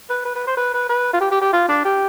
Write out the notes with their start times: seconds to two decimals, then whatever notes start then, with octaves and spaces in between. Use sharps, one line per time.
0.10 B4
0.25 B4
0.35 B4
0.47 C5
0.57 B4
0.74 B4
0.89 B4
1.13 F4
1.20 G4
1.31 G4
1.41 G4
1.53 F4
1.68 D4
1.85 G4